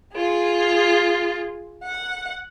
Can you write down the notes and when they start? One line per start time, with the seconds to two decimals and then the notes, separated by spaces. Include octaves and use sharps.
0.12 F4 G#4
1.83 F#5